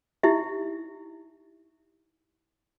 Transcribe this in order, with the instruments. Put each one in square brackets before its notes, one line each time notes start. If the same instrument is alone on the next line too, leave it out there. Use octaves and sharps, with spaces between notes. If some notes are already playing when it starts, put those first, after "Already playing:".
[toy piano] D#4 E4 G4 E5